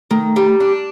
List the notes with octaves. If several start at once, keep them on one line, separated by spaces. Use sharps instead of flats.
D#3 A3
G3
D4